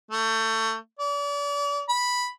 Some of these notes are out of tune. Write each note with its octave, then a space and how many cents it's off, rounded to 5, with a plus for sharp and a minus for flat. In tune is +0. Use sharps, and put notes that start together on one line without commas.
A3 +25
D5 -40
B5 -5